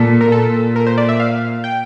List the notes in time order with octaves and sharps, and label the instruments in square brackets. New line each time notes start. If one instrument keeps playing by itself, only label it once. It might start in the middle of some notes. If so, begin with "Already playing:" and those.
Already playing: [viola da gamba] A#2 [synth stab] A4
[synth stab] A#4
[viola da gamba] A#2 [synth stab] A4
[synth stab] A#4
C5
D5
E5
F5
G5